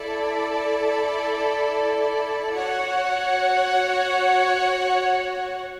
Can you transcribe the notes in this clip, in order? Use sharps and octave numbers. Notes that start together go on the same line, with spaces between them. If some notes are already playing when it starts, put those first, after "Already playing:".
Already playing: E4 A4 D5
F#4 C#5 F#5